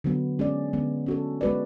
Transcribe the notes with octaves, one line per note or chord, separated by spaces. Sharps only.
D3 F#3 B3
G#3 C#4 G#4 D5
D3 G#3 B3
C#4 F#4 A4
G#3 B3 F#4 B4 D5